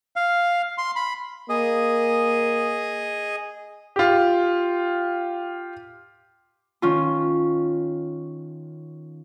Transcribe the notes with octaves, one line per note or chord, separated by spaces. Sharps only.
F5
C6
B5
A#3 G#4 D#5
F4 G4
D#3 C#4 F4